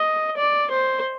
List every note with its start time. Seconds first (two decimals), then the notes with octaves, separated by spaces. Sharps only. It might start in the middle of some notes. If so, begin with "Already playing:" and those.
Already playing: D#5
0.37 D5
0.71 C5